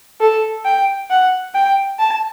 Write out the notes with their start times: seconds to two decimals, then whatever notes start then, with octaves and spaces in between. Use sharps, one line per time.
0.21 A4
0.65 G5
1.10 F#5
1.55 G5
1.99 A5